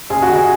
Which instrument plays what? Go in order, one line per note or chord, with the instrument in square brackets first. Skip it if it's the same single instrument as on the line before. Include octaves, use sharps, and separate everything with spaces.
[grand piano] F#1 G#4
F#4
D#3
G#4